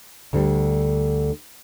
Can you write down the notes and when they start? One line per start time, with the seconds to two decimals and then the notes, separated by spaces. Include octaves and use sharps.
0.33 D2 D3 G3